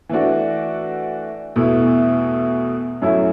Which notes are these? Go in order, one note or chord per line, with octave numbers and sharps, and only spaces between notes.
E3 A3 D4 F#4
E2 B2 A3 E4
F#2 F#3 A3 E4